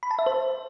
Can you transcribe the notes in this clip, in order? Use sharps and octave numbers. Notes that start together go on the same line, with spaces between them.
B5
A5
E5
C5